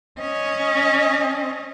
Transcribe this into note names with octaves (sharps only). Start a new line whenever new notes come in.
C#4 D#5